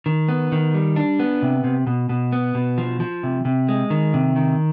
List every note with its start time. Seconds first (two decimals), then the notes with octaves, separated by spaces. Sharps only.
0.06 D#3
0.29 B3
0.52 D#3
0.74 G3
0.96 D4
1.20 B3
1.42 C3
1.64 C3
1.87 B2
2.09 B2
2.33 B3
2.55 B2
2.78 F3
3.00 F3
3.23 C3
3.45 C3
3.69 G#3
3.90 D#3
4.14 C3
4.36 D#3